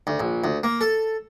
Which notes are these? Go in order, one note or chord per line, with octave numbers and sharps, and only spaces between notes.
D2
A#1
D2
A#3
A4